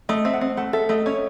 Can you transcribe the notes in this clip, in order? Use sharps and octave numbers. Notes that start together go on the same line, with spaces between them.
A3 D#5
C4 E5
F#5
C4
A3 F#5
A4 E5
A3 D#5
C#4 C#5